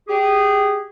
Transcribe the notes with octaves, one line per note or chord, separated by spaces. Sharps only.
G4 G#4